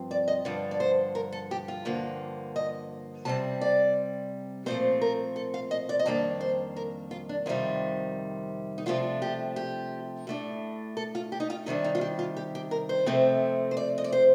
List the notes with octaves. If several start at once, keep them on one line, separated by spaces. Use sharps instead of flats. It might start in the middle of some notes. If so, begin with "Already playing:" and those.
Already playing: G2 F3 C4
D5
D#5
G2 D3 F3 D5
D5
C5
A#4
A4
G4
F4
G2 D3 F3 A#3
D#5
C3 G3 C4 A5
D5
A#2 F3 A3 C4 C5
A#4
A4
F5
D#5
D5
D#5
F2 D#3 G3 A#3 D4 D5
C5
A#4
F4
D4
F2 C3 D#3 G3 F4
D#4
C3 F3 A3 D4 F4
G4
G4
A2 A3 D4
A4
F4
G4
D#4
F4
C3 D#3 G3 D4 D#4
D#4
F4
G4
F4
G4
G4
A#4
C5
F2 C3 F3 A3 C4
C5
D5
D#5
D5
C5